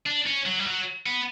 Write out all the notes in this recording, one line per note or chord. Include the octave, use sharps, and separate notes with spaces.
D4
C#4
F#3
G3
F#3
B3